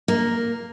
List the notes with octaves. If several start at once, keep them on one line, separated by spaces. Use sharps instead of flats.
A#3